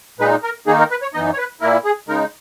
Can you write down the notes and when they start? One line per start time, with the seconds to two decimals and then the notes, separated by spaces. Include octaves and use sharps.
0.19 A#2 G#3 D#4 B4
0.43 A#4
0.67 D#3 A#3 D#4 G#4
0.79 A#4
0.90 B4
1.02 C#5
1.14 F#2 E3 B3 D#4 D#5
1.33 C#5
1.38 B4
1.61 A#2 A#3 E4 A#4
1.84 G#4
2.08 C#3 G#3 D#4 A#4